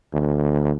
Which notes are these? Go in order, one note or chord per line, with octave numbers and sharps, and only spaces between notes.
D2